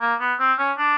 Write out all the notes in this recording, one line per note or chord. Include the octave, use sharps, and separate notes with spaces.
A#3
B3
C4
C#4
D4